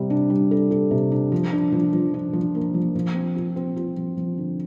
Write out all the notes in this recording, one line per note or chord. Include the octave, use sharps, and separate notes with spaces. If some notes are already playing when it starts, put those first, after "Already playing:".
Already playing: C3 G3
D4
G3
A4
A4
C3
D4
F3
D4
F3
F3
D4
F3
A#3
F3
F3
C4
F4
C4
F4
F3
F3
D3